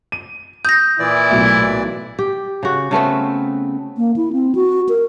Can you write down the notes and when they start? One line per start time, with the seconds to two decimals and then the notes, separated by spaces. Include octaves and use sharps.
0.12 D#7
0.65 D#6 G6 A#6
0.99 A#2 E3 E4 D5
1.30 B1 A2 E5
2.19 G4
2.63 C#3 F#4
2.91 C#3 A3 B3 C4
3.97 A#3
4.16 E4
4.33 C4
4.55 F#4
4.89 A#4